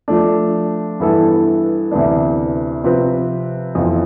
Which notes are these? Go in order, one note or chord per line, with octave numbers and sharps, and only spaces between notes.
F3 A3 D4
G2 E3 B3 E4 A4
D2 C3 E3 B3 D4
C3 F3 C4 F4 B4
F2 E3 B3 F4